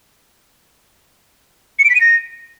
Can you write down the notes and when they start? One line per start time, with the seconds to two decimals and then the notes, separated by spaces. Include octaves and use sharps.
1.79 C#7
1.84 D7
1.90 B6
1.95 D#7
2.01 A#6